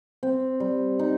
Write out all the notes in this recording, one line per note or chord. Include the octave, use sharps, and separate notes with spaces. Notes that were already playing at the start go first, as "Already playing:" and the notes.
C4
G3
D#4